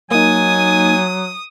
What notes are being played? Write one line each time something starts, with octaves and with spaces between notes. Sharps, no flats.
F#3 A#3 D#4 G#5 D#6